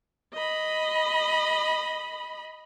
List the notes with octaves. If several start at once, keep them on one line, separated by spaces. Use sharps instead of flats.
D#5 B5